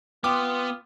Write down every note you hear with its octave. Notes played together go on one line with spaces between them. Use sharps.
B3 F4 G5 C6 D6 D#6